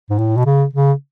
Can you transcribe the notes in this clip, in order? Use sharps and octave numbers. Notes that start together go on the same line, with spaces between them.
G#2
A2
B2
C#3
C#3